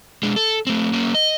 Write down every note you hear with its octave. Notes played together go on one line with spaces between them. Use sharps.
G#3 D4
A4
A3 C4
A#3 C#4
D#5